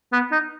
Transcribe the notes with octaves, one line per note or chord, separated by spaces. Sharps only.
B3
D#4